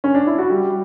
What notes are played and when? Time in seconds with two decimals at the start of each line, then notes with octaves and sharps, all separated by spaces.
0.04 C#4
0.14 D4
0.27 E4
0.38 F#4
0.50 G3 G4